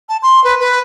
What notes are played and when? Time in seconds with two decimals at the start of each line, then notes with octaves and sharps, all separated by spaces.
0.09 A5
0.22 C6
0.44 B4
0.60 B4